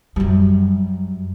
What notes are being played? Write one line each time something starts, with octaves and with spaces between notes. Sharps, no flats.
F#2 G3